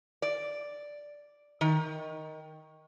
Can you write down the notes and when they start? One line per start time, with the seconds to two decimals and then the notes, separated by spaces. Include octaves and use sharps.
0.22 D5
1.61 D#3